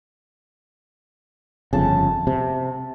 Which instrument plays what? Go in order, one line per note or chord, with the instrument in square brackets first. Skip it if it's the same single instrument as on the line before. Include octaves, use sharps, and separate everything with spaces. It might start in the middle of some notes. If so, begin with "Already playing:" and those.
[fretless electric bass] G1 F2 C#3 [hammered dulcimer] A5
[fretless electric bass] C3